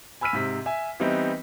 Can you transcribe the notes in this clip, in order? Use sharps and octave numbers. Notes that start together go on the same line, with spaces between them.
G#5 B5 E6 F6 B6 D#7
G#2 C3 B6
E5 G#5
E3 G3 B3 C4 D#4